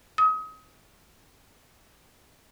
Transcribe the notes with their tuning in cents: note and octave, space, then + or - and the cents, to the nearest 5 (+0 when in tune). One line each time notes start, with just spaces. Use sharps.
D#6 +30